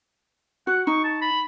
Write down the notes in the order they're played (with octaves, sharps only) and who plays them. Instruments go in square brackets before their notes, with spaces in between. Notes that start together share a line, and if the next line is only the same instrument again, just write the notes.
[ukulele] F#4 [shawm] F#5
[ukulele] D#4 [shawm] C#6
[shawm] A5
B5